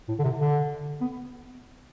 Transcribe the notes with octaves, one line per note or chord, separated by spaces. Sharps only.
A2
D3
C3
D3
B3